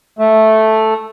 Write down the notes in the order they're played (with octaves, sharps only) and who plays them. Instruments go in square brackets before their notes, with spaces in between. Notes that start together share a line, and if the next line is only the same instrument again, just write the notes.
[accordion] A3